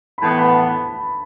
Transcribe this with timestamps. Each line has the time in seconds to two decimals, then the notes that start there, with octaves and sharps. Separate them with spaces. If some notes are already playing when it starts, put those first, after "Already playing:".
0.18 B5
0.22 A2 E3 B3 A5
0.38 B5
0.53 A5